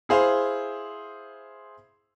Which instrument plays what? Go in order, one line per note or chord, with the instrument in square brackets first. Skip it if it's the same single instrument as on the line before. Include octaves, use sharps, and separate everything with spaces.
[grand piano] E4 G#4 C5 F5